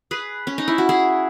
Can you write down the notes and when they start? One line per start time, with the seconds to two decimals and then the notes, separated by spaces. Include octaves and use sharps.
0.11 G#4 B4
0.47 C#4
0.58 D#4
0.68 E4
0.78 F#4
0.89 E4 G#4